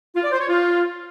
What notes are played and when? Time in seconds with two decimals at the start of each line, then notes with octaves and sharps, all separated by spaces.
0.16 F4
0.24 D5
0.32 C5
0.41 C#5
0.49 F4